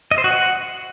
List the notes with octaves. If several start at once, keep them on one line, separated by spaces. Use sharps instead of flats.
D#5
C5
F#4
F#5